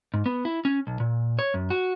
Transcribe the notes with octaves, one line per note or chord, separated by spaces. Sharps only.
G#2
B3
E4
C#4
B1
A#2
C#5
F#2
F#4